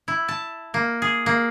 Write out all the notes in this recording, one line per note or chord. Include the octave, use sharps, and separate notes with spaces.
E4
A5
A#3
G#4
A#3